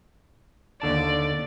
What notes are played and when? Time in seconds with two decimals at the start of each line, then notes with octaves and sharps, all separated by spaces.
0.82 D#2 D3 D5 A5